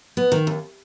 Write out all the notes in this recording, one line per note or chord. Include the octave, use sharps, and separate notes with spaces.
B3
D#3
D#2